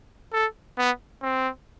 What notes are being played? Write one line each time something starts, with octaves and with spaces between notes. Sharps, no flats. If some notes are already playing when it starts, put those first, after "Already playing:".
A4
B3
C4